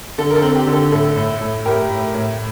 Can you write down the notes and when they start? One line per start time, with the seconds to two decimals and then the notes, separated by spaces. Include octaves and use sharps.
0.18 D3 A4
0.31 A#4
0.36 A4
0.42 C4
0.56 G4
0.67 D3
0.73 A4
0.91 A2 A4
1.16 A2
1.41 A2
1.65 A2 G4 A#4
1.90 A2
2.14 A2